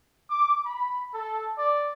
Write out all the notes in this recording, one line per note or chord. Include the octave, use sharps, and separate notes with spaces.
D6
B5
A4
D5